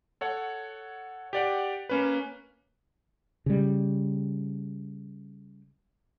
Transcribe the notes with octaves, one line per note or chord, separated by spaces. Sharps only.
A4 C#5 F#5
G4 D5 F#5
A#3 C#4 B4
C#3 G3